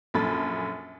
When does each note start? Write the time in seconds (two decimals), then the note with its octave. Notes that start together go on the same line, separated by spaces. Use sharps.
0.14 A#1 F#2 A4 B5 A6